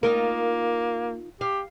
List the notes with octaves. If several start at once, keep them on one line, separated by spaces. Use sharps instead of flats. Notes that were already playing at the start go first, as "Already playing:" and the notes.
A#3 D#4 F4 A#4
G4 F5